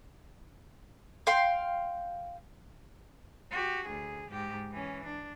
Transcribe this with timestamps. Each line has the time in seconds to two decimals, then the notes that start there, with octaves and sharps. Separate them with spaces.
1.27 F5 G5 C6
3.51 F#4 G4
3.85 D2 G#4
4.29 G#2 G4
4.71 E3 C#4
5.04 D4